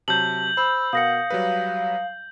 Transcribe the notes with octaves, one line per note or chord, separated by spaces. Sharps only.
C3 F#3 A5 G6 F#7
C5 B5 E6
B2 A#4 F5 F#5 D#6 A#6 C#7
F#3 G3 B4